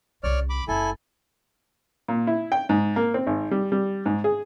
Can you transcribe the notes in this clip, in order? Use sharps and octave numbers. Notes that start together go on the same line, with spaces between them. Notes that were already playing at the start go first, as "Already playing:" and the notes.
C2 C#3 C#5 D5 F6
B5 D6
F#1 E4 A4 G#5
A#2
E4
G5
G#2
A#3
C4
G#1
G3
G3
G#2
G#4